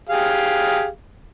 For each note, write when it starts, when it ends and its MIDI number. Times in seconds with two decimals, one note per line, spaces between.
0.09 0.87 67
0.09 0.87 68
0.09 0.87 77